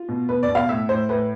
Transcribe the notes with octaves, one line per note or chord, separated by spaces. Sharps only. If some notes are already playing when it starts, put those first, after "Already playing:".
Already playing: F4
B2
B2 B4
D5
B2
F5
A2 E5
A2 C5
A2 B4